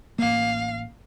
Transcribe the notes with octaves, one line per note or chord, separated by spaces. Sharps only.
A1 A#3 F5